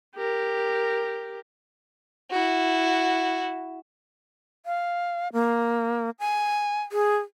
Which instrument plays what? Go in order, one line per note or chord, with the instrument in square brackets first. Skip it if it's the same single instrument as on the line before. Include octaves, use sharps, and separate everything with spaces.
[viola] G4 A#4
[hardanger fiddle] E4 F#4
[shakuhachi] F5
A#3
G#5
G#4